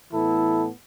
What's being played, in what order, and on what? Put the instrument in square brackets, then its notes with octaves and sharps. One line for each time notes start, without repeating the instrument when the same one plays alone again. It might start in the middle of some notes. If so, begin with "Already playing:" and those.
[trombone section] A2 E3 B3 E4 A4